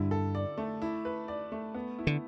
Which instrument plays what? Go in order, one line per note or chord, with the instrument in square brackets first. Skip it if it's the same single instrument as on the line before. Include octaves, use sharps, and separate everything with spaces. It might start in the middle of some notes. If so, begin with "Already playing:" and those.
Already playing: [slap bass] G2 [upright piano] D3 E4
[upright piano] A4
D5
A3
E4
B4
D5
A3
B3
E4
[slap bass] D3